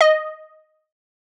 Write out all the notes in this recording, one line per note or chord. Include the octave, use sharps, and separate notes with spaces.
D#5